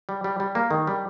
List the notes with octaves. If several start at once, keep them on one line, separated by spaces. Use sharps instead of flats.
G3
G3
G3
A#3
D#3
G3